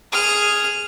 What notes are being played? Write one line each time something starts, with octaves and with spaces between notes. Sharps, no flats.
G#4 F6